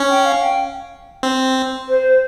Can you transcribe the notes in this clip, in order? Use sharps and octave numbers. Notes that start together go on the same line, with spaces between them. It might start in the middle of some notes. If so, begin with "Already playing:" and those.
Already playing: C#4
G5
F5
G5
C4
C5